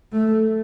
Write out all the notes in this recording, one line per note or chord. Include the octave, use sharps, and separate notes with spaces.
A3